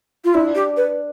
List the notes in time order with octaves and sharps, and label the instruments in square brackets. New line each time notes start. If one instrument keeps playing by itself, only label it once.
[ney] F4
[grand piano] D4 [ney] E4
[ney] G4
B4